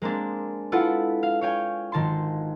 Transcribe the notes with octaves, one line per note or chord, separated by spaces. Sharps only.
G#3 A#3 C4 D4
E4 F4 A4 B4 F#5
F5
C#5 F5 G5 G#5
G#1 D#3 A5 C6